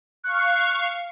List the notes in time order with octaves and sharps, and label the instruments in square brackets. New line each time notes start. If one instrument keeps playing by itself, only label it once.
[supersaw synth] F5 C#6 [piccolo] F#6